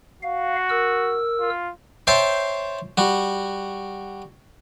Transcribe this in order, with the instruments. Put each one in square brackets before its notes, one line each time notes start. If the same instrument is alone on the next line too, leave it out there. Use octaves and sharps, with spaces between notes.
[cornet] F#4 [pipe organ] F5
[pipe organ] A#4 E6
[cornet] F4
[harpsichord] C5 C#5 E5 G5 A5 C6
G3 F#4